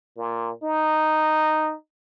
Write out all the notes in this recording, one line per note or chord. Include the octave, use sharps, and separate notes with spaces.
A#2
D#4